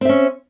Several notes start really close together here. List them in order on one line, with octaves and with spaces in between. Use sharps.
C4 E5 C#4